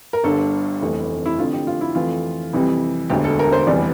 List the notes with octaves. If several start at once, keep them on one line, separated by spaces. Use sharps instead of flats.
A#4
G1 G2 D3 A4
F1 F2 E3 A3
E4
F2 D3 A3 F4
G4
F4
E4
F2 E3 A3 F4
F2 C3 E3 G3
E1 D2 D3 G4
A4
A#4
C5
F1 E2 E3 G3 D5